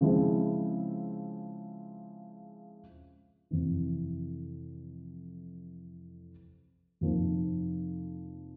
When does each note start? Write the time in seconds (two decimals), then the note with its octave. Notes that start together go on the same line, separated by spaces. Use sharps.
0.01 C#3 F3 G#3 C4 E4
3.51 F2 C3 E3
7.01 F2 C3 F3 A#3 D#4